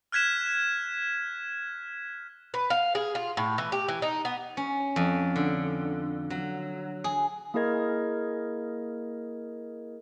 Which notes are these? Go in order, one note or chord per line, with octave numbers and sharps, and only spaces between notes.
F6 F#6 G#6 B6 E7
B4
F5
G#4
F4
A2
E3
G4
E3
D#4
B3
C#4
F2
D3
F#3
G#4
A#3 E4 G#4 A#4 D#5 G#6